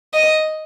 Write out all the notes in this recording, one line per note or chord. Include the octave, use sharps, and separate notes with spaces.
D#5